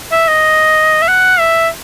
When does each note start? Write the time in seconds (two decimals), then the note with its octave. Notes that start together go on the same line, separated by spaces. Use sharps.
0.12 E5
0.28 D#5
1.02 E5
1.08 F#5
1.39 E5